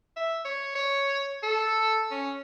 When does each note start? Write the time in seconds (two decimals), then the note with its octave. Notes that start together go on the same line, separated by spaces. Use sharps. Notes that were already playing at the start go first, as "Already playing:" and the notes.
0.16 E5
0.45 C#5
0.75 C#5
1.43 A4
2.11 C#4